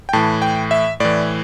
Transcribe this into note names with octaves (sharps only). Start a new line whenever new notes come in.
G5
A2 E3 A5
G5
E5
A2 E3 D5